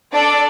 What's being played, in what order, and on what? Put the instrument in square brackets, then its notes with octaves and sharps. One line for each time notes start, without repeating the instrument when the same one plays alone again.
[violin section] D4 A4 D5